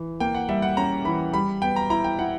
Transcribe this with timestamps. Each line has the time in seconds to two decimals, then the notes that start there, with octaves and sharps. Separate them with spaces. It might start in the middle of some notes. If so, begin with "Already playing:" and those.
Already playing: E3
0.20 A#3 G5
0.35 F#5
0.49 G3 E5
0.62 F#5
0.77 C#4 A#5
1.05 E3 B5
1.33 G3 B5
1.62 B3 G5
1.76 A#5
1.90 E4 A#5
2.04 G5
2.19 E4 F#5